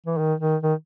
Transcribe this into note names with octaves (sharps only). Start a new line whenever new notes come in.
E3
D#3
D#3
D#3